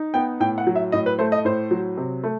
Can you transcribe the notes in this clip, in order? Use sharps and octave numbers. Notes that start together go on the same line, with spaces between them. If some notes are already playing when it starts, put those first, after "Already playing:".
Already playing: D#4
B3 G5
A2 G5
F#5
F#3
E5
A2 D#5
B4
A3 C5
D#5
A2 C5
F#3
C3
A3